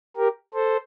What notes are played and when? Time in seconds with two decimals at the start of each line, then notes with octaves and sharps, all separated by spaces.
0.17 G4 A#4
0.54 A4 C5